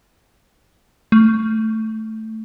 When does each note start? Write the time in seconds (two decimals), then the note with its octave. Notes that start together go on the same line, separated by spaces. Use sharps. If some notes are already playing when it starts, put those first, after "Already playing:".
1.12 A3